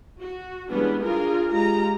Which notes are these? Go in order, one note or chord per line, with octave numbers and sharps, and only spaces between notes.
F#4
E3 G3 G#3 B3 C#4 D4
D4 F4 G#4 A#4
G#3 F4 G4 A#5